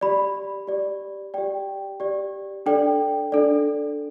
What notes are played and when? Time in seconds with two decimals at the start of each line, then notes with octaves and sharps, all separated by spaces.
0.01 G4 D5 B5
0.67 G4 D5
1.34 G4 D5 G5
2.00 G4 D5
2.66 D4 A4 D5 G5
3.32 D4 A4 D5